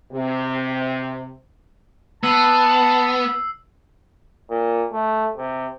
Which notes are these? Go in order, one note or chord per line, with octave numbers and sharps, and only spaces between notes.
C3
B3 A5 E6 C7
A#2
A3
C3